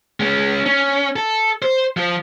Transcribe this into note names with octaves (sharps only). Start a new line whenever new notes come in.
G#3 C#4
C#4
A4
C5
F3